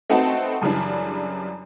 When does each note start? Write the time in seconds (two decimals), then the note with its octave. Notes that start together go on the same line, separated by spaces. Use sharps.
0.10 A3 C4 D#4 F#4 B4 A5
0.62 F#2 C#3 E3 G3 D4